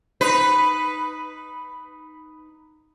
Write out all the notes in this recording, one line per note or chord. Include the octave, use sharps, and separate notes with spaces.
D#4 B4